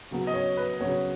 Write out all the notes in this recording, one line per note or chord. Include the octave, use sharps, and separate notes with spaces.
C#3 F#3 B3
D#5
C#5
B4
C#3 F#3 B3 C#5